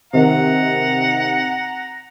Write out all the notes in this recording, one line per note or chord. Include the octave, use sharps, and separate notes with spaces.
C3 D#3 F#5 A#5